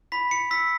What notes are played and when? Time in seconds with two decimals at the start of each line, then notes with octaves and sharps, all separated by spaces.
0.12 B5 B6
0.31 C#7
0.51 E6 B6